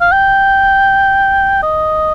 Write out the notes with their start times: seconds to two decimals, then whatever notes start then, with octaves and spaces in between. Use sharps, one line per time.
0.01 F5
0.12 G5
1.62 D#5